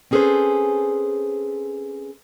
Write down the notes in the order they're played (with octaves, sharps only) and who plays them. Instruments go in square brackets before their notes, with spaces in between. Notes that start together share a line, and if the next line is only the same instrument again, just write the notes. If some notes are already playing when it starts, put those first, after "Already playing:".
[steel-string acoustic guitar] C4 C#4 G#4 A4 B4 C5